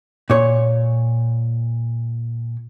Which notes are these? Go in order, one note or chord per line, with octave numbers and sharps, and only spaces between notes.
A#2 C#5